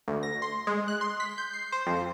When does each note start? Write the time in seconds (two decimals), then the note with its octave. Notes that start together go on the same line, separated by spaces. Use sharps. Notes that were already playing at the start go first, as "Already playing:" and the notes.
0.08 D2
0.23 A#6
0.42 C6
0.67 G#3
0.88 F#6
1.01 C6
1.20 B6
1.38 G6
1.53 C7
1.72 C5
1.86 F2